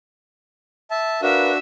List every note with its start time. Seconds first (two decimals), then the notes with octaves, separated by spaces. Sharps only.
0.91 E5 A5
1.22 D4 F#4 A#4 B4 E5 F5